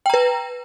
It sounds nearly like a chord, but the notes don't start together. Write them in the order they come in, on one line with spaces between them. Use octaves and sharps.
G5 A#5 B4